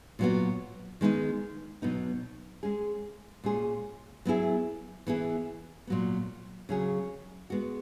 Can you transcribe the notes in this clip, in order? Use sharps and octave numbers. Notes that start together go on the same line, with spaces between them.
A#2 F#3 B3 F#4
D#3 G#3 B3 D#4
B2 F#3 B3 D#4
G#3 C#4 G#4
A#2 G#3 C#4 G#4
F#3 B3 E4 G#4
E3 B3 E4 G#4
A#2 F#3 B3
C#3 F#3 C#4 G#4
G#3 B3 F#4